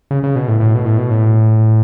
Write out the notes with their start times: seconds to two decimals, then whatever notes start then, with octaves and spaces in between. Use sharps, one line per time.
0.11 C#3
0.23 C#3
0.35 B2
0.48 A2
0.60 A2
0.75 B2
0.86 A2
0.98 B2
1.11 A2